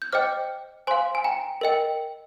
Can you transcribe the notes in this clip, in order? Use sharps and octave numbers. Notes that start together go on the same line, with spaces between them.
G6
C5 D#5 G5 D6 F6
C5 F5 G#5 C6
G#5
G5 A#5
A#4 D#5 G5